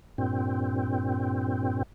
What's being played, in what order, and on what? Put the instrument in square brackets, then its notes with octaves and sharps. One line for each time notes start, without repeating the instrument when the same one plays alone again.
[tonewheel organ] G2 A#2 C4